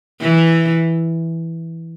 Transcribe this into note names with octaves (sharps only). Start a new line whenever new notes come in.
E3